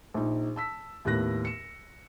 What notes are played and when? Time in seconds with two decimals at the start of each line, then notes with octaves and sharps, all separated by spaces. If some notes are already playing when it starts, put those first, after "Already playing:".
0.14 A#1 D#4
0.56 A5 E6 B6
1.05 D#2 A2 B3 F#6 A#6
1.45 C#7 E7